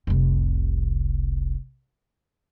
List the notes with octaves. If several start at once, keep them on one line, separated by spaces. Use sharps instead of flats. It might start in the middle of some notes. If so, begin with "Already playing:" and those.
F1 C2